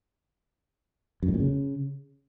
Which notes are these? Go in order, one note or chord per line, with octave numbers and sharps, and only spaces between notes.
F#2
A2
A#2
C#3